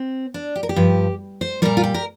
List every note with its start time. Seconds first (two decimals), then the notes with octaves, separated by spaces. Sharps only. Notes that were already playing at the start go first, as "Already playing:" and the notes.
Already playing: C4
0.34 D4
0.56 G4
0.63 A#4
0.69 G4
0.76 G2 F3
1.41 C5
1.62 A#2 G3 A#4
1.77 F4
1.84 G4
1.94 A#4